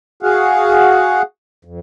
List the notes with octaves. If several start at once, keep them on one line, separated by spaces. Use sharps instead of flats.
F#4 G#4 F5 F#5
F2